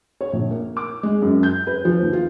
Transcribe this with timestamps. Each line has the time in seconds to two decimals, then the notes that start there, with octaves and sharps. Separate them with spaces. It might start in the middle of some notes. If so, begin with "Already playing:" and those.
0.21 C#5
0.33 A#1
0.51 A#3
0.77 D6
1.03 G#3
1.22 F#2
1.43 G6
1.67 B4
1.85 F3
2.02 D#2
2.13 F4